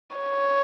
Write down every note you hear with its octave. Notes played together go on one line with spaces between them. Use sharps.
C#5